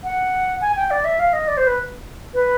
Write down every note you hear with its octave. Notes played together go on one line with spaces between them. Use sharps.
F#5
G#5
G5
D5
E5
F5
D#5
D5
C5
B4
B4